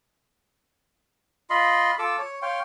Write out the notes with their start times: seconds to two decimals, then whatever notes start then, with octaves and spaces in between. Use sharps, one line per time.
1.50 F4 D#5 B5 C6
1.99 F4 A4 D6 E6
2.19 C#5
2.42 C#5 F5 G5 C6